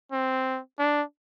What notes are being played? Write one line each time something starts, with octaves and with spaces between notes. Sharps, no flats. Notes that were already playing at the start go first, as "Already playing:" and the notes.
C4
D4